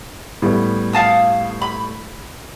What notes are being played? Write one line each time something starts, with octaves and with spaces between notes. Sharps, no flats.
A2 G3 B3
F5 A5 D#6
B5